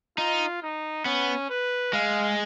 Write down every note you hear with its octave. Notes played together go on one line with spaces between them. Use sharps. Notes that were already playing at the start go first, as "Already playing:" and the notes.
D#4 F4
D#4
B3 C#4
B4
G#3 F5